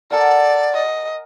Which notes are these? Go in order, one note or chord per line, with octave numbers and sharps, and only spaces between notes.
A4 A#4 D5 F#5 G#5
D#5